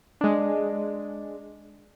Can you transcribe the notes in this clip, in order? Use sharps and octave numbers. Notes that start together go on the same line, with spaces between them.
G#3 D4